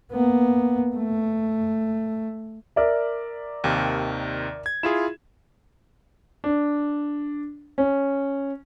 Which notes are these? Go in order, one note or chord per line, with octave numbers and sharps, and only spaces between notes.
A#3 B3
A3
A#4 D5 E5
D#2 C3 D#3
G#6
E4 F4 G#4 E7
D4
C#4